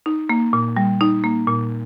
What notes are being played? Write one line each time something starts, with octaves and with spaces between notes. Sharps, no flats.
D#4
A#3
A#2
G3
D#4
A#3
A#2